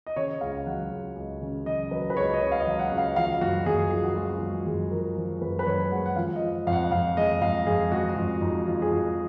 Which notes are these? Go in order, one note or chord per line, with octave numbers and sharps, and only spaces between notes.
D#5
C#3 C#5
C#2 F5
F#3 F#5
C#2
C#2
C#3
F#3 D#5
F#3 B4
B4
C#2 C#5
D#5
C#2 C#5
F5
D#5
F#3
F#5
C#2
F5
F3 F5
F#2 F#4
F#2 G#4
F3 G#4
F#4
G#3 F4
F#4
F#2
F#2 G#4
F3 A#4
F3
F#2 B4
B4
F#2 C#5
G#3 F#5
F#5
F3 F5
D#5
F3
F2 F5
F#5
F2 F5
G#3 D#5
F2 F5
F2 G#4
G#3 F#4
F#4
F2 F4
F2 D#4
F3 F4
G#4
F2 F#4